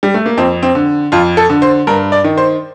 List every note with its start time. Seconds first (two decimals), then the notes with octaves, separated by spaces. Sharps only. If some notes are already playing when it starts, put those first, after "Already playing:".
0.03 G3
0.14 A3
0.26 A#3
0.37 F2 C4
0.63 C4
0.75 D3
1.12 F2 F4
1.37 A4
1.50 D3
1.62 C5
1.87 G2 A#4
2.12 D5
2.24 D#3
2.38 C5